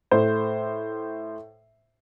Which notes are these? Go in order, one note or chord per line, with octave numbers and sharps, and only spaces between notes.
A2 A3 C5